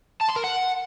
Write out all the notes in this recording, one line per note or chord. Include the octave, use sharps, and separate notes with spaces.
A5
C6
A#4
F#5